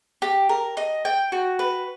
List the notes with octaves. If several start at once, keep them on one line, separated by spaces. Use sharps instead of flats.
G4
A#4
D#5
G5
F#4
B4